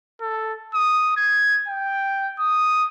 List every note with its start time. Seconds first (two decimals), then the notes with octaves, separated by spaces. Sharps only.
0.21 A4
0.74 D#6
1.17 G#6
1.68 G5
2.40 D#6